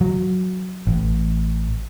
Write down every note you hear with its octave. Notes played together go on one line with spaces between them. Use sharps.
F#3
A1